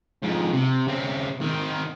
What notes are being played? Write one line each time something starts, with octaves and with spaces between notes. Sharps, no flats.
F2 G#2
C3
C#3 C4
D#3 C4